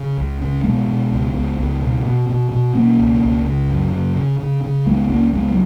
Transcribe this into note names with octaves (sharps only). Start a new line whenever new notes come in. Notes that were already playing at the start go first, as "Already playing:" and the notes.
Already playing: C#3
C#2
C#3
B2 G#3 B3
B2
C#2
C#2
C#2
B2
B2
B2
B2
B2 A#3 C#4
C#2
C#2
C#3
F#2
C#3
C#3
C#3
C#3
C#2 G#3 B3
C#2 A#3 C#4
C#2 G#3 B3
F#3